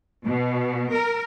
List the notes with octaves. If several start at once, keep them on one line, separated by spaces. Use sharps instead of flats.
B2
A#4